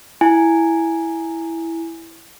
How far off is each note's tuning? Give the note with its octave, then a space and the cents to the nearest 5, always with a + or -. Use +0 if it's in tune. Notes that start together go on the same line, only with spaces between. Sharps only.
E4 +0 G#5 +0